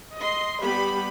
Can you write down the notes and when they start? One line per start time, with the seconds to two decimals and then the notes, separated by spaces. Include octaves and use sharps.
0.15 D#5 C6
0.62 G3 B3 G4 B5